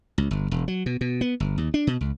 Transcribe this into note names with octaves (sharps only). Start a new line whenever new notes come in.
C#2
G1
E1
F#3
B2
B2
B3
G1
D#2
D4
B2
C#2